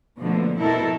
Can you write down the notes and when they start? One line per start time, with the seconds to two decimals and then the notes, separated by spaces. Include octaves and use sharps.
0.19 B2 D3 F3 A3 A#3
0.58 F2 B2 E4 A4 A#4